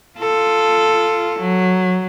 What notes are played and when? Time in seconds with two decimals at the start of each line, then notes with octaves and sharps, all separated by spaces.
0.19 F4 A4
1.39 F#3